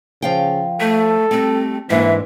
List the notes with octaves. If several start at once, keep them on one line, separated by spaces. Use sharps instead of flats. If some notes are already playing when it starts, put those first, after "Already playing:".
C#3 F3 F5 G5
A3 A4
G3 A3 C4
G#2 E3 A#3 D4 E5